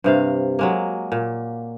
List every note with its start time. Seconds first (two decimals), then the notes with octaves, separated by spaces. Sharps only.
0.04 G2 C3 F5
0.59 F#3 G#3 A#3
1.12 A#2